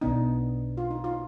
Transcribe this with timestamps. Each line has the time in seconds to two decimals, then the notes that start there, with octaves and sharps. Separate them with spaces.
0.01 B1 B2 B3 D4 D#4
0.77 F4
0.91 D#4
1.04 F4